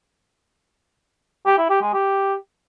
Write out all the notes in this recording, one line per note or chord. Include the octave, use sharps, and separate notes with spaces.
G4
E4
G4
G#3
G4